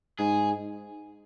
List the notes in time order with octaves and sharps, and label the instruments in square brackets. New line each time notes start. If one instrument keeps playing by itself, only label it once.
[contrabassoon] G#2 [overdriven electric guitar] G#4